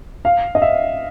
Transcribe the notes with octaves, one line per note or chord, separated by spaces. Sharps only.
F5
D#5
E5